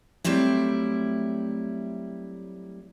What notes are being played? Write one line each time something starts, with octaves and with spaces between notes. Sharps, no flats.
F#3 G3 A3 C4 E4